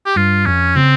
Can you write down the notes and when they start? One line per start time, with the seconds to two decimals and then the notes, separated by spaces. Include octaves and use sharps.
0.06 G4
0.16 G2 F4
0.46 F2 C#4
0.76 C#3 C4